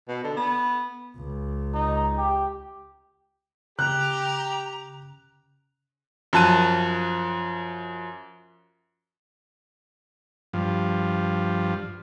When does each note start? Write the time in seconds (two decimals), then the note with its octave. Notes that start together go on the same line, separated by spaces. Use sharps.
0.08 B2
0.24 D3
0.37 B3
1.16 C#2
1.74 D#4
2.18 G4
3.79 C#3 G4 A#5 F#6
6.33 F#2 F3 A5 F#6 D#7
10.53 G2 F3